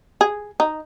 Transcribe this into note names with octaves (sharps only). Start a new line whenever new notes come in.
G#4
D#4